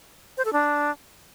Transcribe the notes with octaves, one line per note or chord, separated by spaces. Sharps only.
C5
A4
D4